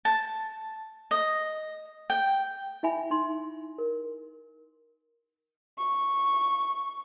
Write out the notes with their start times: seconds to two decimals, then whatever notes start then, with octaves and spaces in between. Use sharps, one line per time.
0.05 A5
1.11 D#5
2.10 G5
2.83 E4 E5 G#5 B5
3.11 D#4 C6
3.78 A#4
5.78 C#6